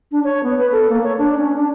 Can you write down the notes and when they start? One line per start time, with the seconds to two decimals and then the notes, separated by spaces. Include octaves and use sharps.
0.12 D4
0.24 C#5
0.43 B3
0.58 B4
0.72 A4
0.89 A#3
1.03 C#5
1.18 D4
1.37 C#4
1.56 D4